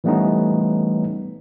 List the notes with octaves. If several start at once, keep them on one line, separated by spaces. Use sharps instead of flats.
E3 G3 A3 B3 C#4 D#4